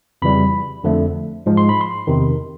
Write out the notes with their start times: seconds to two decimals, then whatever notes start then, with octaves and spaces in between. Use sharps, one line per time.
0.22 F2 C#3 E3 G3 B5
0.84 F2 D3 F3 A3
1.46 G#2 F3 G#3
1.57 C6
1.69 B5
1.81 C6
2.07 E2 C3 D#3